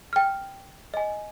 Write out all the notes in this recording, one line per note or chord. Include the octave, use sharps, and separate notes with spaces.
G5 F6
D#5 G#5